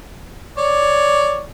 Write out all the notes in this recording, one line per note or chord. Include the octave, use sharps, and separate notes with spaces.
C#5 D5